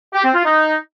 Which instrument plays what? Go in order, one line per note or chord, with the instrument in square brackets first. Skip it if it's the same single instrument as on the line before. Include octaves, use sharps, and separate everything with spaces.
[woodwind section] G4
C4
F4
D#4